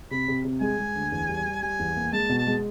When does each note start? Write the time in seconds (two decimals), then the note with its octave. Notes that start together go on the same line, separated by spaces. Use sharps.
0.11 C3 B5
0.28 C3
0.45 C3
0.61 G#3 G#5
0.78 G#3
0.96 D2
1.12 E2
1.29 G3
1.45 G3
1.62 G3 G#5
1.79 E2
1.97 A#3
2.13 G#3 A5
2.29 B2
2.38 A5
2.47 G#3